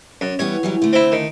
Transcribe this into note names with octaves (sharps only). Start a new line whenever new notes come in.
F#2
E3 G3 B3 C#5
E3 F#3 G3
D3 A3
C4 E4
D#3